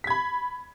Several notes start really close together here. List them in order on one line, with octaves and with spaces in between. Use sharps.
B6 G#6 B5